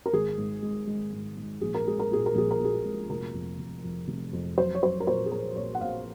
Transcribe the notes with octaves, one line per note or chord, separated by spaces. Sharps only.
A#4
G#1 G#4
G#2
G#3
G#3
G#2
G#2
A#1 G#4
A#4
G#3 G#4
A#4
A#2 G#4
A#4
A#1 G#4
A#4
A#2 G#4
G#3
F1 A#4
F2
F1
F2
F1
F2
F#3 C5
C#5
F#3 C5
A#4
A#2 C5
G#4
A#2 A#4
A#1 C#5
F#5
A#1 F5